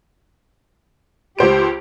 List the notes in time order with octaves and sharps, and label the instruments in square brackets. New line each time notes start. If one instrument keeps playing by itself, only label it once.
[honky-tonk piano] C#2 C5 D7 [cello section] G4